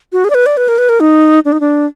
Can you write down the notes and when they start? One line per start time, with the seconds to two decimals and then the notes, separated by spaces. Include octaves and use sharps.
0.13 F#4
0.25 G#4
0.30 D5
0.34 B4
0.46 D5
0.57 B4
0.68 A#4
0.78 B4
0.89 A#4
1.00 D#4
1.45 D4
1.52 D#4
1.60 D4